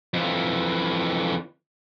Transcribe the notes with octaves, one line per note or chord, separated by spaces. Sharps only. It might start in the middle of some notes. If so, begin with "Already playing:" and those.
F2 E3